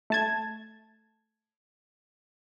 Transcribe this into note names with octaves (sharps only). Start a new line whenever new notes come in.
A3 A5 G#6